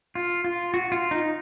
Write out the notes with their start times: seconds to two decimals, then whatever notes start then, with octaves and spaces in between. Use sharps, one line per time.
0.15 F4
0.44 F4
0.74 F#4
0.92 F4
1.11 D#4